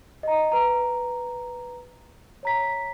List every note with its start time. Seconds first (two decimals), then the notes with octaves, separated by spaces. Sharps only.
0.23 D#5 A#5
0.52 B4 A#5
2.43 C#5 A#5 B6